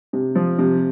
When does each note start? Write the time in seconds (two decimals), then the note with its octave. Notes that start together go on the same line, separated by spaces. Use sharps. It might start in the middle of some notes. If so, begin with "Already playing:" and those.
0.13 C3
0.36 F3
0.58 C3